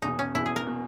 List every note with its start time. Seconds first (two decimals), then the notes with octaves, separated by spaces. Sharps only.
0.02 E1 E2 B2 D#4
0.19 C#4
0.34 E1 E2 B2 E4
0.46 G#4
0.56 A#4
0.67 B2